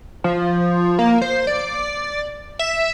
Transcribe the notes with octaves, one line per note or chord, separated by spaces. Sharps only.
F3
A#3
C5
D5
E5